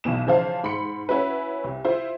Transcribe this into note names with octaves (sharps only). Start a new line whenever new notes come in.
B1 B2 E3 B3 E7
C#3 E3 F3 C5 F5 A5
G#2 B5 C6 C#7
C#4 E4 F#4 B4
C2
E4 F4 C5